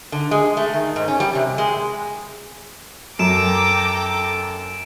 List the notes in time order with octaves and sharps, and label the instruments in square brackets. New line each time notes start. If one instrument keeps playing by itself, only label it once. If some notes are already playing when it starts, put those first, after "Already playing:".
[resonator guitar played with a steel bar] D3
G#3
A3
D#3
G#2
C#4
G3
C3
G#3
[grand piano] F#2 [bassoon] A4 [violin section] G5 A#5 D6 [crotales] D7 E7